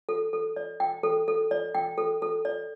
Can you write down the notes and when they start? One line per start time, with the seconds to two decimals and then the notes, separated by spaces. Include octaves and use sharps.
0.09 A4
0.33 A4
0.56 D5
0.80 G5
1.03 A4
1.28 A4
1.51 D5
1.75 G5
1.98 A4
2.22 A4
2.45 D5